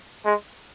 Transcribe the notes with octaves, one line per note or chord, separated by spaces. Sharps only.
G#3